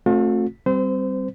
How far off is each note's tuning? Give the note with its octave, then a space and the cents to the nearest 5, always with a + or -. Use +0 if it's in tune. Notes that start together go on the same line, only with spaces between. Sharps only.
A3 +0 C4 +30 F4 +45
G3 +0 C4 +0 C5 -30